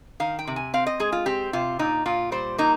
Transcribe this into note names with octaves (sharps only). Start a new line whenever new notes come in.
D#3 F5
G5
C3
G#5
C4 F5
D#5
G#3 G#4
F4
C4 G4
C3 F4
A#2 D#4
A#2 F4
G3 C5
A#3 D#4